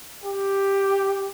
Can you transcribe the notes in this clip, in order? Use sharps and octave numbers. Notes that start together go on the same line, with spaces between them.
G4